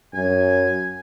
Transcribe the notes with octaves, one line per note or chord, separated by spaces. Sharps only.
F#2 G#5